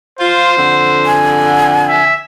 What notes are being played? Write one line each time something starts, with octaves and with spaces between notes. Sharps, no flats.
F4 C5
F2 D3
G#5
E5